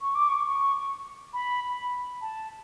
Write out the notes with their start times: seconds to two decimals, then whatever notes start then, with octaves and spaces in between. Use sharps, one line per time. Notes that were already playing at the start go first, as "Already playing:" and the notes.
0.01 C#6
0.15 D6
0.29 C#6
0.45 C#6
1.34 B5
2.22 A5